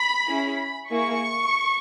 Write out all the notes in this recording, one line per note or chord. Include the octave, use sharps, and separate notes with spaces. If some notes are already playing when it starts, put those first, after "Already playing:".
Already playing: B5
C#4 E4 G#4
A#3 E4 G#4 C#6